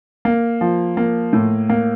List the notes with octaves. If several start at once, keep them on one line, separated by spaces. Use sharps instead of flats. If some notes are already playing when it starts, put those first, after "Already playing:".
A#3
F3
A#3
A2
A#3